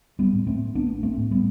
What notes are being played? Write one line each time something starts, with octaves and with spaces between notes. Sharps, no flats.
G3 B3
A2
A3 C4
A1 B3 D4
A3 C4
A2
G3 B3